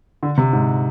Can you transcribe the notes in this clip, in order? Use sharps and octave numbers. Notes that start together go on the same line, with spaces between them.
D3
C3
G#2